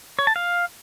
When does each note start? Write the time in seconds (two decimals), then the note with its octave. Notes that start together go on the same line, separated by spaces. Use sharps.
0.19 C#5
0.27 A5
0.36 F5